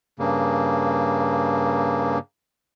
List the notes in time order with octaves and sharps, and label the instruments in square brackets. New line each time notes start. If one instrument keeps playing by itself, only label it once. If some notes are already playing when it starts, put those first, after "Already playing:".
[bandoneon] G2 C#3 A#3